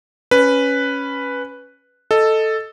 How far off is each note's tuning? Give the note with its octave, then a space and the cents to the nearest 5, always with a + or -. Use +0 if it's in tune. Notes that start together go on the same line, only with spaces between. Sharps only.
C#4 +0 B4 +0
A4 +0 D#5 +0